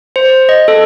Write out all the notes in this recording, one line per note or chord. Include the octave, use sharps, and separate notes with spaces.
C5
D#5
A4